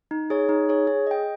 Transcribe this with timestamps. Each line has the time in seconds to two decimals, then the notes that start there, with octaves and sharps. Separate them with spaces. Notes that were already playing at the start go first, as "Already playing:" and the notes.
0.11 D#4
0.30 G#4 C#5
0.49 D#4
0.69 G#4 C#5
0.87 G#4
1.07 D#5 G5